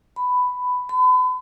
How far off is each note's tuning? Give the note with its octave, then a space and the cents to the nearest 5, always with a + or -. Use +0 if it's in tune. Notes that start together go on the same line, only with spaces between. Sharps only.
B5 +10
B5 +40